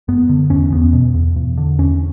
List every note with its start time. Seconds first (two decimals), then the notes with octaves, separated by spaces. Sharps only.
0.08 F#2 B3
0.29 D3
0.50 E2 C#4
0.72 E2 B3
0.93 B2
1.14 E2
1.36 E2
1.57 D3
1.78 E2 C#4